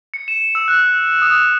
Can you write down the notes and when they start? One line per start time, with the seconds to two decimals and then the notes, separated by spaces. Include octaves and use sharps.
0.14 C#7
0.28 E7
0.55 E6
0.68 F#6
1.22 D#6